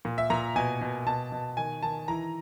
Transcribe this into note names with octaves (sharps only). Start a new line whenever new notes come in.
A#2
E5
A#2 A#5
B2 G#5
B2
B2 A5
B2
D#3 G#5
D#3 A5
E3 A#5